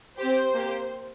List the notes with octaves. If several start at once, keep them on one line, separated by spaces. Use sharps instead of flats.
C4 G4 C5
A#3 G4